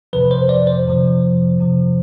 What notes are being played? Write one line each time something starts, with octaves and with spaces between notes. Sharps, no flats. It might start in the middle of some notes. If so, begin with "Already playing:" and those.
F2 C3 F3 B4
C5
D5
C5
F2 C3 F3
F2 C3 F3